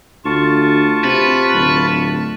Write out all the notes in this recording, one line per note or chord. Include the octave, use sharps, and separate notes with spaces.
D2 F4 A5 C#6
C3 B4
D1